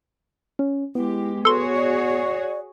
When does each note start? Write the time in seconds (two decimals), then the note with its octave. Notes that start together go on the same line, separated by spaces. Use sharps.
0.59 C#4
0.95 G#3 B3 E4 G4
1.45 F#4 G#4 A4 B4 C#5 C6
1.76 D5